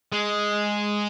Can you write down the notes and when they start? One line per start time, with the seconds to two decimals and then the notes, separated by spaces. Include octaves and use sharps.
0.12 G#3